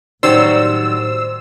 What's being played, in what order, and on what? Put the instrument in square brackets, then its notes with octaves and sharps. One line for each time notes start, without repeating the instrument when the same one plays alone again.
[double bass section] A2 [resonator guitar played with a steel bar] D#3 F#3 G3 [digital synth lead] C5 [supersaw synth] E6